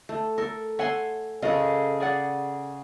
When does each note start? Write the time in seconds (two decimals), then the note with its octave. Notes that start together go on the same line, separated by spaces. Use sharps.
0.09 A3
0.38 A4 A#4
0.79 C#5 E5 F#5 G#5 C6
1.42 C#3 F#4 A4 A#4 D#5
2.00 G#4 D5 F#5